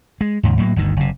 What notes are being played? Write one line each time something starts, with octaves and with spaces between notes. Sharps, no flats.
G#3
D#2 G#2 C#3
A2 F#3 A#3
G1 D2 D#3
F#1 C3